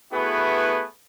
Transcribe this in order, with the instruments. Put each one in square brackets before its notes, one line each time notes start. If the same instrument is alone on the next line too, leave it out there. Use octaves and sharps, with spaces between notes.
[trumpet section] A3 B3 E4 F#4 G#4 B4